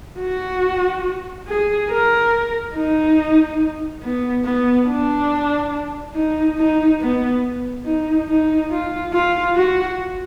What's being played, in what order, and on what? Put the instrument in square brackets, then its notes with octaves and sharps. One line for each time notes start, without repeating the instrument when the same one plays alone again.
[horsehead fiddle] F#4
G#4
A#4
D#4
B3
B3
D4
D#4
D#4
B3
D#4
D#4
F4
F4
F#4